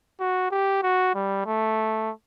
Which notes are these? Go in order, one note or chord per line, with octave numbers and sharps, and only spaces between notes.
F#4
G4
F#4
G3
A3